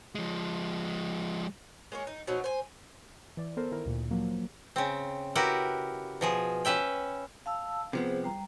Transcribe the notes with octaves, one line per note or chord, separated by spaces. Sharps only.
F3 G#3
G#3 A#3 C#5
D#4
B2 F3 F#3 D#4
C5 G#5
E3 D5
B3 A4 A#4 C5
D#3 E4 A#4
D2 A#2
F3 F#3 A#3
C#3 C4
E4 F#4 G4 A#4 B4
B2 F3 G#4
C#4 B4 E5 G5
F5 A5 E6
C3 F3 B3 G#4 C5
G3 A#5